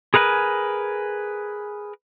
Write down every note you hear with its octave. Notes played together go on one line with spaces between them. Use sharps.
G#4 A#4 B4 F5 G#5